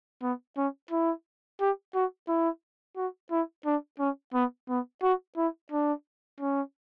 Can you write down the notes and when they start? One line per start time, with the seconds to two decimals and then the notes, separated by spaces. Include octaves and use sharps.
0.22 B3
0.57 C#4
0.91 E4
1.60 G4
1.95 F#4
2.28 E4
2.97 F#4
3.31 E4
3.65 D4
3.99 C#4
4.34 B3
4.69 B3
5.03 F#4
5.37 E4
5.72 D4
6.40 C#4